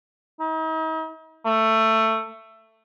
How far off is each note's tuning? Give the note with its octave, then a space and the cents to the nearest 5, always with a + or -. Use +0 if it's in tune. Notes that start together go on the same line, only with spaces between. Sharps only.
D#4 +45
A3 +15